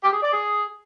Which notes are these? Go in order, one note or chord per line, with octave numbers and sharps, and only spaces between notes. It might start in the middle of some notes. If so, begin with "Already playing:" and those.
G4
G#4
D5
G#4